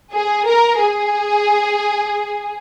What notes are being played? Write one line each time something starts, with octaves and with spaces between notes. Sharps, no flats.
G#4
A#4
G#4